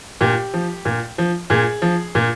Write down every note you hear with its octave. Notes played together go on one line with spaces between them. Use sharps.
A#2 G4
F3
A#2
F3
A#2 G#4
F3
A#2